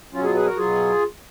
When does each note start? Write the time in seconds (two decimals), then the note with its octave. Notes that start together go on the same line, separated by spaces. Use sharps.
0.13 B2 F#3 C#4 F4
0.24 F4 G#4
0.34 G#4 B4
0.46 F#4 A#4
0.57 B2 F#3 F4 G#4